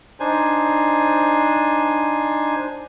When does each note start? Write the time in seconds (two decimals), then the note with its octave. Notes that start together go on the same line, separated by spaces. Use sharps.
0.20 D4 D#4 C5 G#5